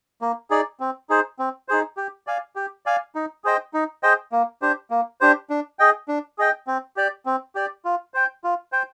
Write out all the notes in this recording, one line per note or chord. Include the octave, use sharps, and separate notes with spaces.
A#3
D#4 G#4 D5
C4
D#4 G#4 C5
C4
D#4 G#4 C5
G4
D5 F5 G#5
G4
D5 F5 G#5
D#4
G#4 C5 D#5 G5
D#4
G#4 C5 D#5 G5
A#3
D4 G4 C5
A#3
D4 G4 C5
D4
G#4 D#5 G5
D4
G#4 D#5 G5
C4
G4 D5
C4
G4 D5
F4
C5 G5
F4
C5 G5